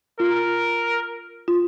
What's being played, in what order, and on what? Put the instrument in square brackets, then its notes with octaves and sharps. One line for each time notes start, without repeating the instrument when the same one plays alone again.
[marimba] F4 [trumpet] A#4
[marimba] F4